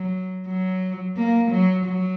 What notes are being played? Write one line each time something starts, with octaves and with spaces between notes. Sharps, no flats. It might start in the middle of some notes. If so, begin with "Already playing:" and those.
Already playing: F#3
F#3
A#3
F#3
F#3